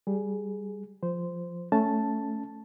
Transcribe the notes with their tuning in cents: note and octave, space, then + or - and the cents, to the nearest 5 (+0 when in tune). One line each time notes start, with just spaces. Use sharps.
G3 +0 G#4 +10
F3 +0 C5 -15
A3 +0 C#4 +10 A5 +0